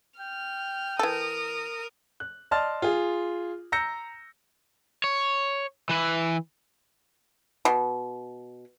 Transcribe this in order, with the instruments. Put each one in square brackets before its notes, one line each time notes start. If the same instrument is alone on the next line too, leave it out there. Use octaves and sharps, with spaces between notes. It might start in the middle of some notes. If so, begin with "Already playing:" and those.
[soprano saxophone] G5 [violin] F6
[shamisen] E3 A4 [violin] A#4 D#6
[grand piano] F#6
D5 D#5 A5 C6 F6 A6
F4 G#4
A#5 E6 G6 A#6 C#7
[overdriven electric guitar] C#5
E3 B4
[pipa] B2